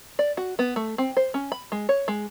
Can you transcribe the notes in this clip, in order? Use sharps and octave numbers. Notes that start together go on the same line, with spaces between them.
D5
F#4
B3
A3
C4
C5
C#4
B5
G#3
C#5
G#3